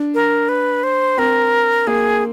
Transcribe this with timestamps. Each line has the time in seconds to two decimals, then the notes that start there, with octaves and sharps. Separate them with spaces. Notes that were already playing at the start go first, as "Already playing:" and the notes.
Already playing: D4
0.14 A#4
0.49 B4
0.83 C5
1.18 C4 A#4
1.87 A#3 G#4